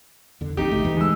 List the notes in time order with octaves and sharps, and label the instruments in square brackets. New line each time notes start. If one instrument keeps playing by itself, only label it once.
[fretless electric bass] E2 D3
[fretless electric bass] A#1 D#2 [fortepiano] D#4 G4
[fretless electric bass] G2 C#3 A3
D#2 C3 E3
[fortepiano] G#3 E6